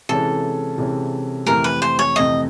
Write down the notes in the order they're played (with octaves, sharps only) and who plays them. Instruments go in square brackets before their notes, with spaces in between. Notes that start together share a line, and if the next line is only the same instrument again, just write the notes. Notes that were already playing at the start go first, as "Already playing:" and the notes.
[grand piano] C3 E3 G#3 C#4 [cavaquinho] A4
[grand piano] C3 E3 G#3 C#4
[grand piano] F2 C3 E3 A3 [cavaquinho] A#4
[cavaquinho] B4
C5
C#5
[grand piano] F2 C3 E3 A3 [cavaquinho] D#5